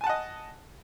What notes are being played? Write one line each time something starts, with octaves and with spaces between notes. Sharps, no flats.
D#5 F#5 G#5 A5